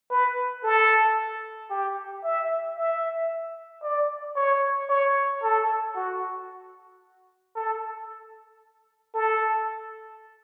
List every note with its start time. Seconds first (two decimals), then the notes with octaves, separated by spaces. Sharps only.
0.11 B4
0.64 A4
1.70 G4
2.24 E5
2.77 E5
3.83 D5
4.36 C#5
4.89 C#5
5.43 A4
5.96 F#4
7.55 A4
9.14 A4